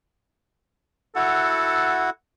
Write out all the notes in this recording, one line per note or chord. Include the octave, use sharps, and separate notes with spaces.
E4 F#4 A4 F#5